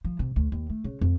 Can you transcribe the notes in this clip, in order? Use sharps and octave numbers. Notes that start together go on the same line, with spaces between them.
F3
C3
D2
D#2
A3
C#3
F2